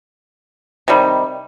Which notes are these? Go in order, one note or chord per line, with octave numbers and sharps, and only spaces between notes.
C3 D#3 G3